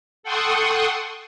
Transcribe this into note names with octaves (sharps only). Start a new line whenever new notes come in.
A4 F#5 G5 C6 C#6 D#6